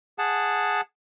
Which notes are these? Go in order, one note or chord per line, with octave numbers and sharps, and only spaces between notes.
G#4 F#5 A5